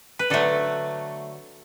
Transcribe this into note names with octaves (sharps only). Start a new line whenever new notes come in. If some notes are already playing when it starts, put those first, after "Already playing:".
B4
D3 F#3 A3 A4